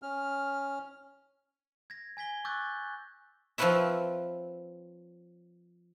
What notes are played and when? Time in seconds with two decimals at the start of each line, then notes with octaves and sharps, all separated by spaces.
0.02 C#4 F6
1.90 G#6 A#6
2.17 G#5 G#6 B6 G7
2.45 C#6 D6 E6 F#6 G6 A6
3.58 F3 C4 F4 B4 C#5 E5